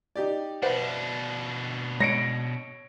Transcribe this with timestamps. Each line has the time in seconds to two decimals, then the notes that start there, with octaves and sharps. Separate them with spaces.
0.16 D#4 G4 D5
0.63 B2 D4 B4 C5 E5 F#5
2.00 G#3 C#5 A#6 C#7 D7